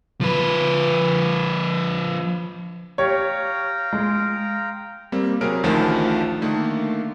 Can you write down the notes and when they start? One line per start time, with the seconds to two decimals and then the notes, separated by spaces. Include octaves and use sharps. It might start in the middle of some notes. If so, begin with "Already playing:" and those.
0.21 F3 B4
2.98 G4 C#5 F5 G5 A#5
3.93 G#3
5.12 G3 A#3 C4
5.41 C3 F#3 G#4 A#4 F6 D7
5.63 A1 D2 D#3 F3 A3
6.42 D3 D#3 A3 A#3